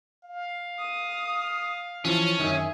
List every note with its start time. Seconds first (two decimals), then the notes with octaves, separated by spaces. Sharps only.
0.24 F5
0.78 D#6
2.05 E3 F3 C#4 A5
2.40 F#2 D#3 G#4 E5 G#5